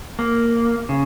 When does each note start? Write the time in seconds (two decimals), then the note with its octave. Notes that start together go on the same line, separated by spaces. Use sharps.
0.19 A#3
0.89 C#3